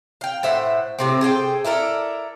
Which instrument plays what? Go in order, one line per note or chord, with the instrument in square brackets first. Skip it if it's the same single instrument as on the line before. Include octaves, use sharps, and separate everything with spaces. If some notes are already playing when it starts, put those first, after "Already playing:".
[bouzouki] F5 G5
A2 C5 E5 F#5
A2 C3 C4
G#4 A4 C5 G5
E4 A4 A#4 D5